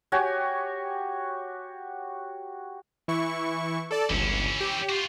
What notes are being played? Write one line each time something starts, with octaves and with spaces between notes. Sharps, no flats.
F#4 G4 C#5 G#5
E3 E4 C#6
A4 D5 A5
G1 C#2 E3 C#4
G4
F4 F#4